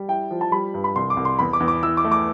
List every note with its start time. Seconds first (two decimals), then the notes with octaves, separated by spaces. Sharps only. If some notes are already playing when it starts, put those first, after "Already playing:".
Already playing: G3
0.08 E4 G5
0.31 F3
0.41 A5
0.52 G3 B5
0.74 G2
0.84 B5
0.96 C2 C6
1.10 D6
1.17 C2
1.25 C6
1.39 E2 B5
1.53 D6
1.60 E2
1.68 D6
1.83 E3 E6
1.97 D6
2.05 A3
2.12 D6